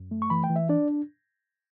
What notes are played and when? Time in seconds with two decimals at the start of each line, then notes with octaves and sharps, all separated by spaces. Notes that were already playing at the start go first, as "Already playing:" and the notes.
Already playing: F#2
0.11 A3
0.22 C#6
0.30 E3 B5
0.44 G5
0.49 E3
0.56 E5
0.69 D4 D5